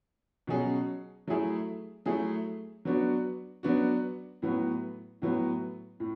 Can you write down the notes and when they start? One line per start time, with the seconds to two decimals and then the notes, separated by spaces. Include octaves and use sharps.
0.47 B2 F#3 C#4 G#4
1.28 F#3 A3 E4 G#4
2.06 F#3 A3 E4 G#4
2.85 F#3 B3 D4 F#4
3.63 F#3 B3 D4 F#4
4.42 A2 F#3 B3
5.22 A2 F#3 B3
6.00 A2